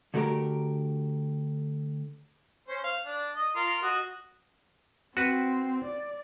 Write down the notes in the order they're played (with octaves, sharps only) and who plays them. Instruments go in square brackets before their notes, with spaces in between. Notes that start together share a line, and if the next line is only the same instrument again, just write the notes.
[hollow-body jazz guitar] D3 A3 F#4 G4 A#4
[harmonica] C#4 C5
F5
D4
D#5
F4 A#4
F#4 D#5
[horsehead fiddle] C4 [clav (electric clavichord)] F#4 B4
[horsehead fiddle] D5